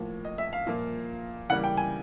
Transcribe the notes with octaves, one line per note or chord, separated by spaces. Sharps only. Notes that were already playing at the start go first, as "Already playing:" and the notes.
Already playing: A2 F3 A#3
D#5
E5
F5
A#2 F3 A#3
C#3 E3 G3 A#3 F#5
G5
G#5